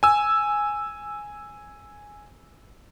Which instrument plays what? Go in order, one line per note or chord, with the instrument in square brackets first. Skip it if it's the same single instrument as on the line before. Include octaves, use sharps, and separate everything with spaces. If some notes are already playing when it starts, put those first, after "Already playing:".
[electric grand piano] G#5 E6